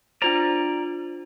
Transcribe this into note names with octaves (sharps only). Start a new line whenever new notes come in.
D4 F4 C5 D5 A#5